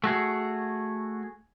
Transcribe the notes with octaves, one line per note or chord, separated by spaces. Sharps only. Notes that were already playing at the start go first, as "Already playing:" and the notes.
A3 F#4 G#4